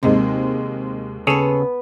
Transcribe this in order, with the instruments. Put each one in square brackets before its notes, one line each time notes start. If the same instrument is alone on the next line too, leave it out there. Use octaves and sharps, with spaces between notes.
[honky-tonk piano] D#2 G#3 C4 [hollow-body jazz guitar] C3
[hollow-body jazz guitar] C#3 [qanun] B3 B4 [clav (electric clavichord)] G#4 A4 C#5